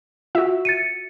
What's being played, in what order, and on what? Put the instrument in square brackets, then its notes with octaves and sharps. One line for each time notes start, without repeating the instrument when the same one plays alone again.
[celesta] F4 [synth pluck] F#4 E5
[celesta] A6 C#7 D#7